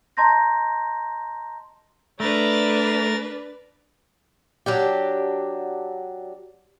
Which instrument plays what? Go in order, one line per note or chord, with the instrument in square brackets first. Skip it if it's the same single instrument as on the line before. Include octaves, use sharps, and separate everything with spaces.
[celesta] D#5 A5 A#5 C6 G6 A#6
[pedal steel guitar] A3 [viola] D4 B4 [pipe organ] A#4 A6
[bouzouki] F#3 D4 G4